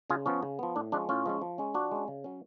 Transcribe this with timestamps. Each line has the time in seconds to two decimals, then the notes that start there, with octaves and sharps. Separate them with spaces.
0.10 C#3 F4 G#4
0.26 F3 B3 C#4
0.43 C#3
0.59 F3 B3
0.76 A2 D4
0.92 F3 G#3 C#4 D4
1.09 A2 C#4 F4
1.26 F3 G#3 C#4
1.41 F3
1.58 G#3 C#4
1.74 F3 D4 F#4
1.91 G#3 C#4
2.08 C#3
2.24 F#3 C#4